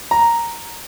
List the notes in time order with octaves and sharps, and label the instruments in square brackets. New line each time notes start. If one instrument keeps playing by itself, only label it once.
[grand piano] A#5